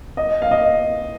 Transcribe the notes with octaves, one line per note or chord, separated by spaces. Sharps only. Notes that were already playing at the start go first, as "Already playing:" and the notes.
D#5
F5
D#5